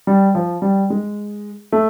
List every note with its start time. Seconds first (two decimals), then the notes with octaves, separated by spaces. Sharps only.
0.07 G3
0.35 F3
0.62 G3
0.90 G#3
1.72 A3